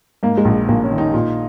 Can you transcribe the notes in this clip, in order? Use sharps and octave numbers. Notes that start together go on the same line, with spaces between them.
G#2 A#3
G#3
A#1
A#1 A#3
C#4
D#3
D#4
A#2